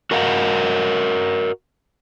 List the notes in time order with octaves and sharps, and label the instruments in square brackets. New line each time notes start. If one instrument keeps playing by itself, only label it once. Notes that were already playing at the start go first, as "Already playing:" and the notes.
[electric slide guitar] F#4 A#4 D#5 F5 F#5